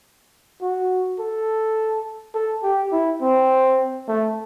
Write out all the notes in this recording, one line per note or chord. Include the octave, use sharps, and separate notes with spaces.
F#4
A4
A4
G4
E4
C4
A3